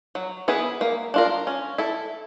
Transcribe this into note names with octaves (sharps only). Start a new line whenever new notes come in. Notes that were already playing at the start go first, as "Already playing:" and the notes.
F#3
B3 E4 G#4 B4
A#3
D4 F4 A#4
C#4
E4 A4